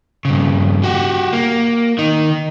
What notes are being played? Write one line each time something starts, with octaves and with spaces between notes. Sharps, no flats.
G2 C#3
F#4 G4
A#3
D#3 D#4